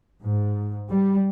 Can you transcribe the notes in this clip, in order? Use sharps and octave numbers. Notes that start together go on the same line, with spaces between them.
G#2
G3